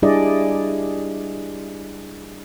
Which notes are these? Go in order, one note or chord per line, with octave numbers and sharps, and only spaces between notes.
G3 D4 E4 G#4 D5 D#5